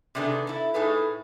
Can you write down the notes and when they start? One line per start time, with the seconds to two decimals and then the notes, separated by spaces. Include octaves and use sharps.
0.15 C3 D#3 B3 D4 G#4 A4
0.47 E4 A4
0.74 A2 D#4 G#4 A4 B4